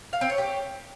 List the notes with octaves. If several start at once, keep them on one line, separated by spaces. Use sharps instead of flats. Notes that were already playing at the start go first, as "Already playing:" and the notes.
F5
C4
C#5
G4